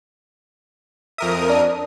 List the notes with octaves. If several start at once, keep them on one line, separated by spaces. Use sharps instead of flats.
F2 A#4 E5 D#6
D4